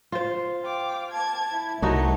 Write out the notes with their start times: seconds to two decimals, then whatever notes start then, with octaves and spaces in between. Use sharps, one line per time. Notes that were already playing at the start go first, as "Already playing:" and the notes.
0.12 F4 C5
0.63 F5 G5 D6
1.11 A5 G#6
1.52 E4
1.82 C2 C3 A3 D#4 F#4 C#5